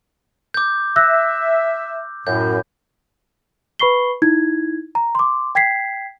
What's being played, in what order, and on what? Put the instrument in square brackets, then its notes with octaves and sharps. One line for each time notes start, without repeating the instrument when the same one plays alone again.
[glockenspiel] D6 G6
[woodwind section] E5 [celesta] E6 F#6 A#6
[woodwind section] F#2 A2 [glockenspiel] G6
[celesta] B4 B5 C#6 C7 G7
D#4 E4 G#6
A#5
C6 D6
G5 G#6 B6 C7